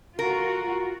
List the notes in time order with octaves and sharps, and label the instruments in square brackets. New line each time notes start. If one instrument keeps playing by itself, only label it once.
[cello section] F4 F#4 [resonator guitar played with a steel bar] A#4